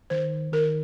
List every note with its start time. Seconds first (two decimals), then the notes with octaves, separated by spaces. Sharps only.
0.10 D#3 C5
0.52 D#3 A#4